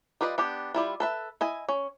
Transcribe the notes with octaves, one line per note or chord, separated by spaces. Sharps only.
G3 F4 B4 D5 D#5
B3 D4 G4
G3 E4 F4
A4 B4 E5
E4 D#5 G#5
C#4